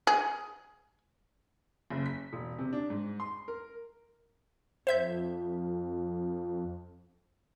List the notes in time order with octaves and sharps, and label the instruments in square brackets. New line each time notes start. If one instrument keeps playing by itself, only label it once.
[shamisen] G#4
[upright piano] F#1
B6
E1
C3
D4
G#2
C6
A#4
[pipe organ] F2 [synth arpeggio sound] C5 E5 G6